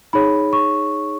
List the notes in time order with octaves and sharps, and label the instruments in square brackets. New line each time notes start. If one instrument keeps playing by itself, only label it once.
[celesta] D#4 G#4 C#5 B5
C#6